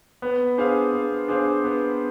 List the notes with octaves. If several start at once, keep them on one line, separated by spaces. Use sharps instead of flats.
B3
D4 G#4 C5 F5
B3
D4 G#4 C5 F5
B3